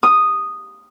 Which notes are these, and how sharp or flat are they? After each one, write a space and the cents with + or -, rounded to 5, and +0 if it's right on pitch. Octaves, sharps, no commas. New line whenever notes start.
D#6 -5